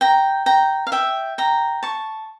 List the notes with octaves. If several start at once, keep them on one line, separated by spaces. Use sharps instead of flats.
G5 A#5
G5 A#5
F5
E5 G5
G5 A#5
A5 C#6